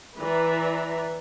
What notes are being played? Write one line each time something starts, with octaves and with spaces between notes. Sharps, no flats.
E3 B4 D5 E5 A#5